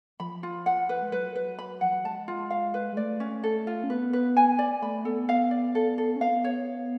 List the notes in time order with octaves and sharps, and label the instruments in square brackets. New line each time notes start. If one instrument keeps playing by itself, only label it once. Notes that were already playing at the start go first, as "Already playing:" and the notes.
[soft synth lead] F3 [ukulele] B5
[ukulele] F4
F#5
B4
[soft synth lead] G#3
[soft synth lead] F#3 [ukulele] B4
[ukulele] B4
B5
[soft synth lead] F3 [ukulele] F#5
[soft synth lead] F#3
[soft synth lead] G#3 [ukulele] A5
[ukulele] F4
F5
B4
[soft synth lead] G#3
[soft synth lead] A3 [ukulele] D5
[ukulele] C#4
A4
F4
[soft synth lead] C#4
[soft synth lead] B3 [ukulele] B4
[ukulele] B4
G#5
D5
[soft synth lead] A3 [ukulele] B5
[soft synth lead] B3 [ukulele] A4
[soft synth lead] B3 [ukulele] F5
[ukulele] D5
A4
A4
[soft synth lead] C#4
[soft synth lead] B3 [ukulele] F5
[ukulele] C#5